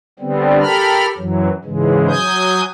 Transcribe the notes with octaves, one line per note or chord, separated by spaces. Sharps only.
D3 G3 B3 C4
G4 A4 A#4 B5 F6
F#2 E3 F#3
G#2 C#3 E3 G#3
F#3 G#5 D#6 G6